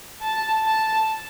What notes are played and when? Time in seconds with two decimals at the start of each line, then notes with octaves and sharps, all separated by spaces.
0.22 A5
0.65 A5